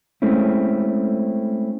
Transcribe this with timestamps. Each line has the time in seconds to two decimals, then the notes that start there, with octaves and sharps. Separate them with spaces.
0.22 G#3 A3 C4 C#4 E4